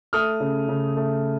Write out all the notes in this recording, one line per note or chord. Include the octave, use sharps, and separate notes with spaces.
A3 D#6 F6
C#3
C#3
A3